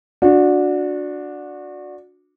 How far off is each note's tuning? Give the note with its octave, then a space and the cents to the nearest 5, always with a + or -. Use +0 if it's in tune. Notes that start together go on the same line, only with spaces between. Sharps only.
D4 +0 F#4 -25